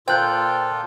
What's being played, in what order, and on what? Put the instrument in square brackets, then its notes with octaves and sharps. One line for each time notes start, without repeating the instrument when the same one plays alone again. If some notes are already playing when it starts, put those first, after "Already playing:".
[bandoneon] A#2 F4 A4 [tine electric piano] C5 F#6 [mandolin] G5